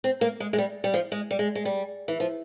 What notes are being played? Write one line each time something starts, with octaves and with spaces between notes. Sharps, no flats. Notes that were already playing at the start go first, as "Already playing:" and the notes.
C4
A#3
G#3
G#3
G3
G3
F3
G#3
G3
G#3
G#3
G3
E3
F3